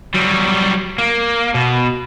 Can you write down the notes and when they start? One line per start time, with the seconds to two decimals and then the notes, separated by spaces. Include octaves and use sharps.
0.15 F#3 G3
0.98 A#3
1.55 B2